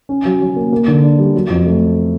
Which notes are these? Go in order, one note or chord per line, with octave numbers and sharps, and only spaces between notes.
C#4
F#3
F#3
A#3
A#3
D3
D4
G3
F#3
F2
A3